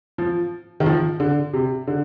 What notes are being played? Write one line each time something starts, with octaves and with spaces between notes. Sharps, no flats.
F3
D#3
F3
D3
C3
D3